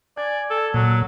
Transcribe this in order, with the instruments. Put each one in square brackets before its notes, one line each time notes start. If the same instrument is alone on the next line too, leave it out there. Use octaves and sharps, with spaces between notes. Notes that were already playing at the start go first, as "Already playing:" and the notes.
[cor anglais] D5 [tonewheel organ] G#5
[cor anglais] A4
[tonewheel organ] A#2 [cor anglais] F#3